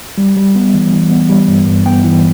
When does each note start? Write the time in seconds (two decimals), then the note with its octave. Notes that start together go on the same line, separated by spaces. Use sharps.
0.18 G3
0.36 G3
0.56 B3
0.74 E3
0.92 E3
1.11 B3
1.29 G3
1.48 G2
1.67 G2
1.86 B3 G5
2.04 E3